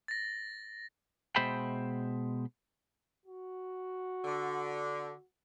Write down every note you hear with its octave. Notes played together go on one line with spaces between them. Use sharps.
A6 A#6
B2 G#3 C5 E5 G5 B5
F#4
D3